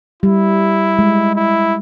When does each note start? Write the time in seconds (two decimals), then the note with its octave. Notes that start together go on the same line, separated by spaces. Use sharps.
0.23 G3 E4
0.99 G#3
1.36 E4